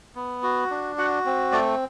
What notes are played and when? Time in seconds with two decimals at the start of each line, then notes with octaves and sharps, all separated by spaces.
0.15 B3
0.43 F#4
0.70 D4
0.98 F#4 F#5
1.26 C4
1.52 A3 D5